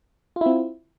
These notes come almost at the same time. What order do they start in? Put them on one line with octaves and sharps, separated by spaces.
F4 E4 C4